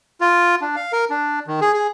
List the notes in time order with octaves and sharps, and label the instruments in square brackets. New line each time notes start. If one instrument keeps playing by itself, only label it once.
[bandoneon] F4
D4
F5
A#4
D4
D#3
G#4
G#4